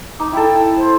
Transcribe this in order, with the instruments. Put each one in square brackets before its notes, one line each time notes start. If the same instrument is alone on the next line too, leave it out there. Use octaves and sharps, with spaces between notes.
[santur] D#4 [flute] D6
[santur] E4 A4 [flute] G5
[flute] C5